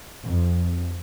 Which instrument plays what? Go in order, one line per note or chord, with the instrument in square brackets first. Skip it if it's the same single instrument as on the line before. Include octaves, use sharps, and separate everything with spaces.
[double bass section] F2